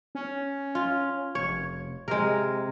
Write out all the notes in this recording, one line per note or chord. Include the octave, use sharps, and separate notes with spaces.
C#4
F4
F1 C#5
C3 G#3 A#4